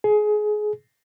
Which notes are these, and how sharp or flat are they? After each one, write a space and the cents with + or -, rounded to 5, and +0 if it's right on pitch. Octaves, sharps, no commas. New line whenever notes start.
G#4 +25